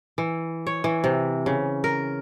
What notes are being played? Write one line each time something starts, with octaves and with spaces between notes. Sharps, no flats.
E3
C#5
E3
C3
C#3
A#4